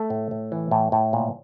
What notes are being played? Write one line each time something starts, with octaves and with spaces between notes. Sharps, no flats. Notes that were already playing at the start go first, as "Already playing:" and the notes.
Already playing: A3
A2
A2
E3
A2
A2
A#2